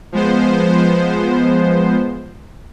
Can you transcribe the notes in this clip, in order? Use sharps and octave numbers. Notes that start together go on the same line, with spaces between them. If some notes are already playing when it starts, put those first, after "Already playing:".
F3 G#3 B3 C5